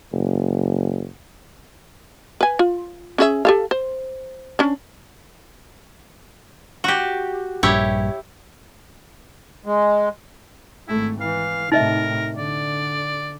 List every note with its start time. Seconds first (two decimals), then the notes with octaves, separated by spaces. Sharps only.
0.12 F#1
2.41 B4 G#5
2.59 F4
3.18 C#4 G#4 E5
3.45 G4 A4 F5
3.71 C5
4.59 C#4 D4
6.84 F#4 G4
7.63 A#1 G2 E4 G4 C#5
9.66 G#3
10.88 G#1 A3 E4
11.21 E3 F5
11.72 A2 C3 D#4 A#4 D#5 E5
12.37 D3 D5